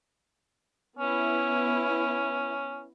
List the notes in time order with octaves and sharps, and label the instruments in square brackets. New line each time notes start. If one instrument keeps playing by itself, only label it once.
[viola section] B3 E4 [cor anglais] C#4